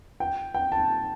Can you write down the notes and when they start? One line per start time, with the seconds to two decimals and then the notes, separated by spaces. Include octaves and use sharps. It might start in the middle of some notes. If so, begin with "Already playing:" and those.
0.20 G5
0.54 G5
0.72 A5